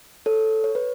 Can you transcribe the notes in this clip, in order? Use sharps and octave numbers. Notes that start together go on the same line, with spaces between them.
A4 C#5
C#5
B4